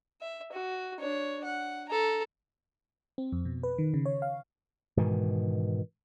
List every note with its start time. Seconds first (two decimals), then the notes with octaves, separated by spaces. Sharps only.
0.21 E5
0.52 F#4
0.99 D4 C#5
1.44 F#5
1.89 A4 A#5
3.18 C4
3.32 F2
3.45 B2
3.63 B4
3.78 D#3
3.94 C#3
4.06 C#5
4.22 F5
4.97 G#2 B2 D#3 E3